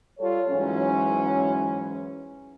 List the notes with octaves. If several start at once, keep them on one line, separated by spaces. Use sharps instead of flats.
G3 F4 A4 C#5
G#2 E3 F#3 C#4